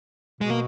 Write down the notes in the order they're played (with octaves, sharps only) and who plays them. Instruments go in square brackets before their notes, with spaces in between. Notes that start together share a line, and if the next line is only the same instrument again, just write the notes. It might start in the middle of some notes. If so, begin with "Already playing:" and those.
[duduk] B2 [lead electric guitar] G#3
[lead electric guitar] A#3